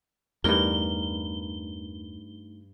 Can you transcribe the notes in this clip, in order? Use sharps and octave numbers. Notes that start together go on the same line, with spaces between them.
E2 G2 A3 D#4 A#4 G7